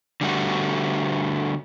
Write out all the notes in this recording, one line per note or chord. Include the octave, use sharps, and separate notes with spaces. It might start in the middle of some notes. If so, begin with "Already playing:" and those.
D3 G3 A3 F#4